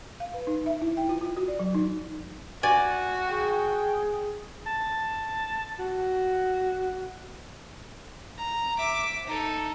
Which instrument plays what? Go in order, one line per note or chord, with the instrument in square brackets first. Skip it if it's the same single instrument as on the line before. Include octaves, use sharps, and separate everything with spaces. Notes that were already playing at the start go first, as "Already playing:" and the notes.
[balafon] F5
B4
D#4
E5
E4
G5
F4
F4
F#4
D5
F#3
D#4
[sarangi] F#4 [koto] D5 G#5
[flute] G#4 [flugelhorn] G5
[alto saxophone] A5
F#4
[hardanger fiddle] A#5
E5 D6
D#4 A4